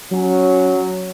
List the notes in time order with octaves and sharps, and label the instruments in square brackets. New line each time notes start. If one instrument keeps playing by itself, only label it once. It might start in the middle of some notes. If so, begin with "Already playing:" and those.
[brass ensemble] F#3 C#4